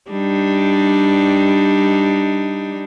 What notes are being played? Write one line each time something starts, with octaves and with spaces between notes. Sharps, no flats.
G3 D4 D#4